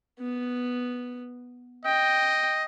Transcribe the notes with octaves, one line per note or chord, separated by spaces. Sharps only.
B3
D#5 G5